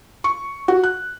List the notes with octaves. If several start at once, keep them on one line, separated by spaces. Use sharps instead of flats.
C#6
F#4
F#6